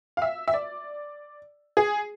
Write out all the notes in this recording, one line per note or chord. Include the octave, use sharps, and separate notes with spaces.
F5
E5
E5
D5
G#4